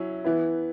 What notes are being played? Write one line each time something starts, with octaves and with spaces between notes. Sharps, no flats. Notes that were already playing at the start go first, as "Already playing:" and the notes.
Already playing: F#3 C#4 E4
E3 B3 E4